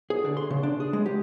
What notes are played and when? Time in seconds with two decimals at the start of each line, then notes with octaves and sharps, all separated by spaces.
0.10 G#4
0.24 D3
0.37 C6
0.50 C#3
0.63 D4
0.80 G#4
0.93 G#3
1.06 G4